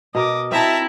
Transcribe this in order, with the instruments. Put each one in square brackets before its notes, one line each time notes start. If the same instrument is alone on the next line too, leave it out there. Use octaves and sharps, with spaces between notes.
[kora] B2 A#4 [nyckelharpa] D#5 D6
[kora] C4 [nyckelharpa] E4 [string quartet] E5 A5 A#5